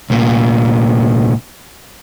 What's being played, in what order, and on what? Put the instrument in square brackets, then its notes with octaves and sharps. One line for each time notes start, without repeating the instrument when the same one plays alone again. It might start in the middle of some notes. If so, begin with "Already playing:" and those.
[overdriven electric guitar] C2 A#2